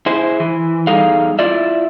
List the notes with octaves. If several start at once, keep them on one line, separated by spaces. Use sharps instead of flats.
E4 G#4 C5
E3
E2 G3 D#4 G#4 A4 F5
E4 F4 D5 E5